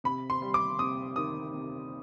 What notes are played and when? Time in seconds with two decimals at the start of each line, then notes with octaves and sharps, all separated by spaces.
0.04 C3 B5
0.30 C6
0.42 G3
0.54 D6
0.79 C3 D#6
1.16 D#3 D#6
1.53 C3